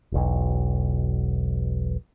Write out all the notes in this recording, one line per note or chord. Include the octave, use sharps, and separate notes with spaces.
E1 B1